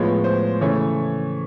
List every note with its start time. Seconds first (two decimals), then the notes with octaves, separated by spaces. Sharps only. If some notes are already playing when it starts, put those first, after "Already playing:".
Already playing: A2 F3 G#3 B3 C#5
0.24 C5
0.61 C#3 E3 A3 C#5